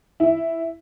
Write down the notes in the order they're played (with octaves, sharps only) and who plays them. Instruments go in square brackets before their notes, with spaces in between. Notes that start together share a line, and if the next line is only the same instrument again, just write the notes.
[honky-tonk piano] E4